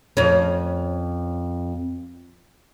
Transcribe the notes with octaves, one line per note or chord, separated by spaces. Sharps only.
F2 C#4